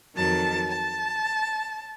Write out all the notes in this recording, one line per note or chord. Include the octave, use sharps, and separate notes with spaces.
F2 D#3 F#3 A5
A5